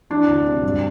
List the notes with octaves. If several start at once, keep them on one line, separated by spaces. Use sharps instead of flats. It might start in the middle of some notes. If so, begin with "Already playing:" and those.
E3 D4
D2
C3
G2